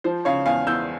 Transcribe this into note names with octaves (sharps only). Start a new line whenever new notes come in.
F3 C5
C#3 C#5 F5
E2 F5 G#5
E2 E6 G6